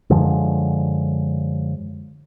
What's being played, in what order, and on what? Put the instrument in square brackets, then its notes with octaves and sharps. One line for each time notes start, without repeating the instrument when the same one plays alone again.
[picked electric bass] F#2 D3 F3 G#3